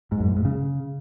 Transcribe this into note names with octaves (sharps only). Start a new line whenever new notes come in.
G#2
F#2
A2
G#2
C#3